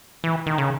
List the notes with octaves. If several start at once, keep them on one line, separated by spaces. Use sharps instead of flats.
E3
D#3
C#3